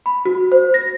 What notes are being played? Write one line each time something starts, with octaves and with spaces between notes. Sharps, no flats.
B5
F#4
C5
A#6